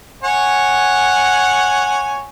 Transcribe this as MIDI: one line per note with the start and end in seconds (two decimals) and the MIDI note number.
0.24 2.28 73
0.24 2.28 78
0.24 2.28 80